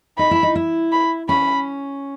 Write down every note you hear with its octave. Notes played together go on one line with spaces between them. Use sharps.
D#4 B5
E4
D#4
E4
B5
C#4 B5